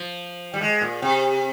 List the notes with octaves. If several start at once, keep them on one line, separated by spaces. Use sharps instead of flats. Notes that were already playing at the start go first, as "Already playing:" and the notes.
Already playing: F3
G3
G#3
A#2
C3